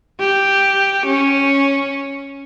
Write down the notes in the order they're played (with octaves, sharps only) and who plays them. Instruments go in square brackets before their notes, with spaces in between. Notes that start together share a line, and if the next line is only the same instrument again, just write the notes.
[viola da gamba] G4
C#4